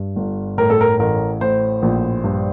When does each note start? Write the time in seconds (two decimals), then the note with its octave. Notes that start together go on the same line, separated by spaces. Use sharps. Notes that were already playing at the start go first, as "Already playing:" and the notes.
Already playing: G2
0.16 G1
0.58 A2 A#4
0.70 A4
0.81 A#4
0.99 A1 A#4
1.41 A2 C5
1.82 A#1
2.24 G2